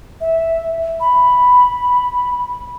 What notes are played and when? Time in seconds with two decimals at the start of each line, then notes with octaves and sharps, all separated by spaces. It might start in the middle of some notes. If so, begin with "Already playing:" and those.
0.21 E5
1.00 B5